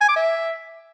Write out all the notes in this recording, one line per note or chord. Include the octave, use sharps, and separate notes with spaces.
G#5
D6
E5